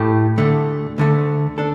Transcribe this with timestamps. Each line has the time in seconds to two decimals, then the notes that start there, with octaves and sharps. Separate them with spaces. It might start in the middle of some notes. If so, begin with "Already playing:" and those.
Already playing: A2 A3 G4
0.38 D2 D3 A3
0.98 D2 D3 A3
1.58 D4 A4